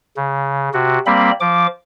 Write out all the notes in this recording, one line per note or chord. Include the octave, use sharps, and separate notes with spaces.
C#3
C3 F#4
G3 A#3 C4 B5
F3 D6